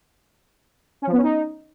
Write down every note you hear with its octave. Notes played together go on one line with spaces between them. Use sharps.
C#4
F3
B3
C#4
D#4